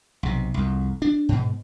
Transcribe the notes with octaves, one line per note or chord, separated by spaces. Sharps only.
B1 C3
C2 F2
D4
G#2 B2